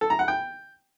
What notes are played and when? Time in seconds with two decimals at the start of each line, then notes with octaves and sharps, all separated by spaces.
0.01 A4
0.10 A#5
0.19 F#5
0.28 G5